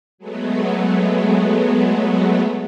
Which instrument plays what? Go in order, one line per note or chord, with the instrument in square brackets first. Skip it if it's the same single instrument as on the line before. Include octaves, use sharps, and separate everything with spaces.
[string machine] F#3 G#3 A3 B3